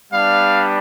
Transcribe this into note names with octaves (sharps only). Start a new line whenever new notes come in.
G3 B3 D4 F5